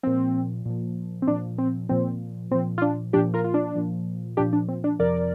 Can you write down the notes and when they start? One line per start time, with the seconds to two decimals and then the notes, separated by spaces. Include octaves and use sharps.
0.03 A#2 F3 C4
0.66 A#2 F3
1.22 C4
1.27 A#2 F3 D4
1.58 C4
1.89 A#2 F3 C4
2.51 A#2 F3 C4
2.78 F4
2.82 D4
3.13 A#2 F3 D4 G4
3.34 F4 A#4
3.44 F4
3.54 D4
3.75 A#2 F3
4.37 A#2 F3 D4 G4
4.53 D4
4.68 C4
4.84 D4
4.99 F2 C3 F3 A#4 D5